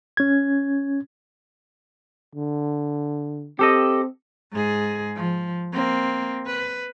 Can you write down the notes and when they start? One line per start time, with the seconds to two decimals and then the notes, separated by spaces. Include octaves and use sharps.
0.17 C#4 G#6
2.35 D3
3.59 C4 G4 A4 D#5
4.53 G#2 G#4
5.16 F3
5.73 A#3 C4
6.46 B4